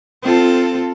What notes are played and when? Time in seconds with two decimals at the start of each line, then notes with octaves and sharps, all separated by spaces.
0.22 C4 F4 A4